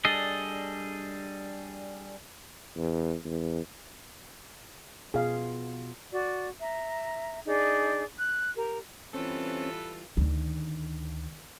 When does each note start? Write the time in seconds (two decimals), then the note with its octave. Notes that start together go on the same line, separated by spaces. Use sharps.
0.05 G3 D4 G#4 A4 D#5
2.76 E2
3.25 E2
5.14 B2 B3 F4 G#4 F5
6.12 F#4 D5
6.60 E5 A#5
7.45 D4 D#4 G#4 D5
8.19 F#6
8.56 G4 A#4
9.14 E3 G3 C4 C#4 F4 A4 B4
10.17 D2 D#3